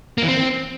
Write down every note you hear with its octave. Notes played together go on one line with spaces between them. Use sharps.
A#3
E3
C4